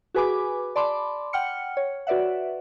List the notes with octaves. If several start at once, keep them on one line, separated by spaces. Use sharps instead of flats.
F#4 G#4 B4 G#5 B5 D6
D5 A5 B5 C6 D6
F#5 G5 F6 C#7
C#5
F#4 B4 D5 E5 F#5